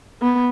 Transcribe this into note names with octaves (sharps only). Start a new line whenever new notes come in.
B3